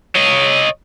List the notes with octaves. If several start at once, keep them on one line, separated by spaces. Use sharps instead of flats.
C#5 D#5